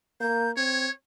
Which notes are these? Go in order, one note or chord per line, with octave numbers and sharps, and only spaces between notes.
A#3 G6
C4 C#5 G#6